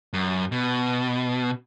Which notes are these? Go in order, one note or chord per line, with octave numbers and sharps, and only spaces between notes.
F#2
B2